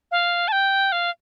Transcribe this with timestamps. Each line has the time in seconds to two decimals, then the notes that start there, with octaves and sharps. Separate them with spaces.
0.11 F5
0.48 A5
0.52 G5
0.92 F5